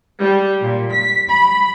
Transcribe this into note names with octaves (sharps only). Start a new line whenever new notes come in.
G3
A#2
B6
B5